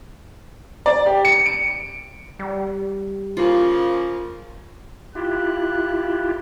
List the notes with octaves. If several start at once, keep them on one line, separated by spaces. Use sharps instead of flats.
D5
G4
C#7
D7
G3
C#3 F3 A#3 F4
E4 F4 G4 F#6